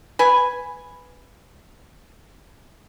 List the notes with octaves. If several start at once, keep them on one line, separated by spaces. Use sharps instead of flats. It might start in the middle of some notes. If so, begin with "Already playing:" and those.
B4 G#5